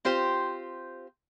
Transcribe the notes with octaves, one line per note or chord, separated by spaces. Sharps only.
C4 F4 G4 C5